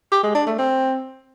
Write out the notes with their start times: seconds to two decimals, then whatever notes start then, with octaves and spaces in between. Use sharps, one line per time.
0.12 G4
0.23 G#3
0.35 D4
0.47 A3
0.58 C4